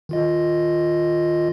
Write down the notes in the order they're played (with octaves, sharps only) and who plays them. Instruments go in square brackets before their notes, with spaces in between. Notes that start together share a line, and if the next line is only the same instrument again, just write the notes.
[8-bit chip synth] D#3 F4 D#5